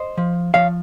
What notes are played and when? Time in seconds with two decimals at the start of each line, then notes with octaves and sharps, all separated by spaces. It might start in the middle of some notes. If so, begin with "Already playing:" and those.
Already playing: C5 D#5
0.17 F3
0.54 F3 C#5 F5